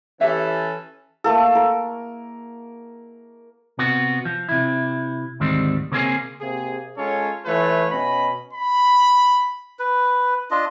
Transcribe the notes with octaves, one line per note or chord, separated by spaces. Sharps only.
E3 C#4 G4 A4 E5
A3 A#3 A4
A#4
C3 B3 F#4
F3
C3 E4
D2 G#2 D#3 G3 C4
C#3 A#3 C4 C#4 G#4
C3 A#3 G#4
G#3 C#4 F4 A4 C#5
E3 A3 F4 B4 C#5
B2 C#4 D#5 B5
B5
B4
D4 F4 D#5